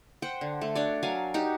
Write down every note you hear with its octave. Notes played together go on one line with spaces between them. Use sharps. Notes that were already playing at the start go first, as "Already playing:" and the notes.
C5 F#5 G5
D3
A3
D4 F#4 C#5 D5
F#3 A#4 F5 G#5
D#4 F#4 G4